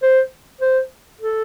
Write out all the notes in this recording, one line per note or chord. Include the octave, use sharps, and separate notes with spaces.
C5
C5
A4